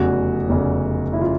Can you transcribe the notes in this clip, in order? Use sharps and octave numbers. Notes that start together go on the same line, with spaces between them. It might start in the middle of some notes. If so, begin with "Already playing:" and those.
Already playing: F1 E2 C#3 F#4
F1 E2 C#3
E4
C#3 F4